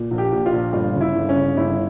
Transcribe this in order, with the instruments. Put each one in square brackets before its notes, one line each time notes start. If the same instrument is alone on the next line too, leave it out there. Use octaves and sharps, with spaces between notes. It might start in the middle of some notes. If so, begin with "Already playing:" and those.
Already playing: [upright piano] A#2
A#1
G4
A#2
F4
A#1
G1 F4
C#3
E4
G1
C#4
C#3
G1 E4